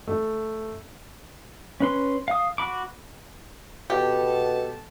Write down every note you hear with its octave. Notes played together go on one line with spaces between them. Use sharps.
A3
C#4 B4 C6
F5 D#6
F#4 B5 D6
B2 B3 G4 A4 A5